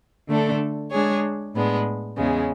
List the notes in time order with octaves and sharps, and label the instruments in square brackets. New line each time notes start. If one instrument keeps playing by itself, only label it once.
[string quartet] D3 A3 D4 A4
G#3 D4 G#4 C#5
A2 G#3 B3 D4
E2 C#3 G#3 C#4